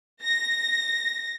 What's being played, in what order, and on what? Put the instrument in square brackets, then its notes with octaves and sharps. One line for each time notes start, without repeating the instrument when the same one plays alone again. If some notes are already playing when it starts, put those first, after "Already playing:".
[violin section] A#6